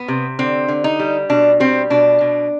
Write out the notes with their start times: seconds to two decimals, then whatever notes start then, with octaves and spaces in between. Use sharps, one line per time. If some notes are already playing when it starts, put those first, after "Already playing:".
Already playing: B3
0.08 C3
0.39 D3 C4
0.68 D3
0.84 D#4
0.99 G3
1.29 B2 D4
1.60 G3 C4
1.90 B2 D4
2.21 B2